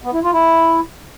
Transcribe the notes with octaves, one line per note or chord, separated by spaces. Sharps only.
B3
E4
F4
E4